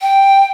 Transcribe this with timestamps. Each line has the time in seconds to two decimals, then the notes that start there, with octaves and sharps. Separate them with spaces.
0.01 G5